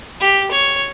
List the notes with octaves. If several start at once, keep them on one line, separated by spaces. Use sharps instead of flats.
G4
C#5